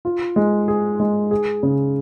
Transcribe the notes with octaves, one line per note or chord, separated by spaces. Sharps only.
F4
G#3
G#4
G#3
G#4
C#3